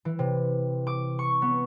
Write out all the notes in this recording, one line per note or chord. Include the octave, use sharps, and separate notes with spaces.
E3
C3
D6
C#6
B3